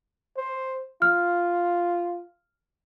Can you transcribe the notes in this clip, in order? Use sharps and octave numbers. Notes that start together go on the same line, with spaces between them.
C5
F4 F6